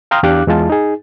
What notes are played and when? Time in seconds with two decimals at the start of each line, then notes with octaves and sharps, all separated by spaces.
0.11 F5 G5 A#5 C6 D#6 F6
0.23 E2 D4 G4 F5 D6 F#6
0.47 E2 G#3 F4 A5
0.70 D#4 G#4